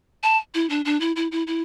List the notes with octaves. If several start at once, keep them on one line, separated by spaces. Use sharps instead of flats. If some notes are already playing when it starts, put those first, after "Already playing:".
A5
E4
D4
D4
E4
E4
E4
E4